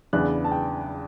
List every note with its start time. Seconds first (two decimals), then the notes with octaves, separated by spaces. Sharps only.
0.13 E2 C#3 E3 B3 D4 F#6
0.44 A5
0.52 G5